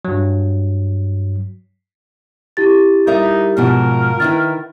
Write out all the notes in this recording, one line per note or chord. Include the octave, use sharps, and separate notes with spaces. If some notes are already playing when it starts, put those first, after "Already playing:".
G2 F#3
E4 G4 A6
G3 D#4 A#4 E5
G#2 B2 F3 A#4
D#3 E4 B4 A6